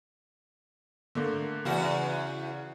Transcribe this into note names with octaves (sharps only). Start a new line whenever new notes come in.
D3 A3 A#3
E2 C#3 F#4